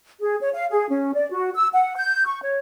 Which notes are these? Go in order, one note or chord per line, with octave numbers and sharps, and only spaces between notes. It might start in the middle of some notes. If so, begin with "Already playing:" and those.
G#4
C#5
F5
G#4
C#4
D5
F#4
E6
F#5
G6
C#6
C#5